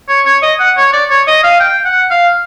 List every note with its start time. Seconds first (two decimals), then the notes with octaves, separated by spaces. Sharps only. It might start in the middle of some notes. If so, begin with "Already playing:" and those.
0.08 C#5
0.25 C#5
0.42 D#5
0.59 F#5
0.77 C#5
0.93 D5
1.10 C#5
1.27 D#5
1.43 F5
1.60 G5
1.85 F#5
2.10 F5